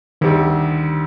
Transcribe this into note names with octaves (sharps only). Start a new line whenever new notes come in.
D2 C3 D#3 G3